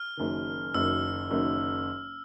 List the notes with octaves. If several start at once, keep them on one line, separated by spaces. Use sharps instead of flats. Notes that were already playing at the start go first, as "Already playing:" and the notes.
Already playing: F6
F#1 F#2 D#3
F#1 F#2 D#3 E6
F#1 F#2 D#3